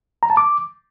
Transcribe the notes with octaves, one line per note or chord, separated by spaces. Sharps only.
A#5
A5
D6